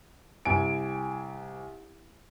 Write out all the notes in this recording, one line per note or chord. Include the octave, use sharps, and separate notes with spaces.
C2 G#5 D7